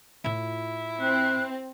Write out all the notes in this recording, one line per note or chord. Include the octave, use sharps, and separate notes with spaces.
A2 E4 F4
C4 F#6